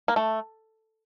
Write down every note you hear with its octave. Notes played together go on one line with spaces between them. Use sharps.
A#3
A3